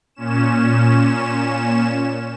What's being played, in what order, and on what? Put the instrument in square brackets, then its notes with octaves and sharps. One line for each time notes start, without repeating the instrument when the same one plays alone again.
[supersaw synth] A#2 C#4 E7